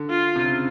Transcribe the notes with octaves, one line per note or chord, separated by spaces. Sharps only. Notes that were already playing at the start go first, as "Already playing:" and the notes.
Already playing: D3
F4
C3
C#3